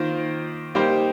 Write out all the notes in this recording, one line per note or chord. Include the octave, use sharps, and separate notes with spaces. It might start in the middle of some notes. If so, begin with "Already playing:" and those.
Already playing: D#3 A#3 F4 C5
G3 A#3 D#4 G4 C5